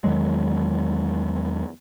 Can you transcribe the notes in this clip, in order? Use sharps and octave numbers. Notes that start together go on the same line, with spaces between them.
E2 D#3 F#3 G#3